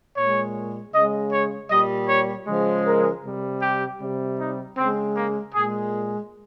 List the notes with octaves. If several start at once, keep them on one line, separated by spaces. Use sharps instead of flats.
A#2 G#3 C#5
C#3 G#3 D#5
C#5
A#2 G3 D#5
C#5
C#3 F3 G#3
A#4
C3 G3
G4
C3 G3
D#4
C#3 G#3 C4
A#3
A#2 G#3 G#4